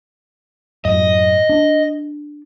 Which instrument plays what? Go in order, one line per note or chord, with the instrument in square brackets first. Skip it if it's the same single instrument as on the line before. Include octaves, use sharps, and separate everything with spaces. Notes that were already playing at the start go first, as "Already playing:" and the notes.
[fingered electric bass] F#2 A2 [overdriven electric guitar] D#5
[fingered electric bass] D4